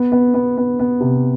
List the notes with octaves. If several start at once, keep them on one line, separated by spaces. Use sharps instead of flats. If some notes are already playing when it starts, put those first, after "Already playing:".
Already playing: B3
B3
B3
B3
B3
C3